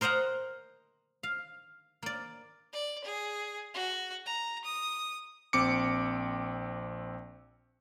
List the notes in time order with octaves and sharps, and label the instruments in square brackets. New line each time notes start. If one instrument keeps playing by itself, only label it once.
[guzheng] A#4 C5 D#5 F#5 A#5
F5
A#3 D5
[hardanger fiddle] D5
G#4
F#4
A#5
D#6
[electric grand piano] A#1 C4 D6 C#7